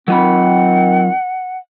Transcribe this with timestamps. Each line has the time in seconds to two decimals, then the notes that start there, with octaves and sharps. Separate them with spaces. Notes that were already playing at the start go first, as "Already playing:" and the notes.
0.08 D#3 F#3 C4 F4 F#5 B5